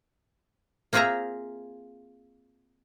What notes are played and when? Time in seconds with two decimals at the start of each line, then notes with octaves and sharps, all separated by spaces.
0.93 A#3 C4 F4 G#4 E5 A#5